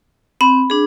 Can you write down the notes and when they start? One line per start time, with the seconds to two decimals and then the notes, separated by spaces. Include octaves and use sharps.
0.41 C4 B5
0.70 D4 G#4